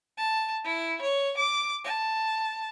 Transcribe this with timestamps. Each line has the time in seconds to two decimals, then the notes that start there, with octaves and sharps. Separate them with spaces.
0.18 A5
0.64 E4
1.02 C#5
1.37 D6
1.84 A5